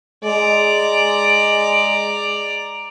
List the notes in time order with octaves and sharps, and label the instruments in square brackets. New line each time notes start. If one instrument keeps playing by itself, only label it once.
[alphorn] G#3 [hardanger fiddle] D5 A#5